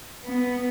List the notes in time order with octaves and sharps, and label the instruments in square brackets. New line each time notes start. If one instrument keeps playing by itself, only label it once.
[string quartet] B3